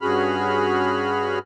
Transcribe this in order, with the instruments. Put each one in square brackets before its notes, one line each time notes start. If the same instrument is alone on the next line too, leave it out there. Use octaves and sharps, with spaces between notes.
[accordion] G2 C#4 F#4 G#4 B5 F6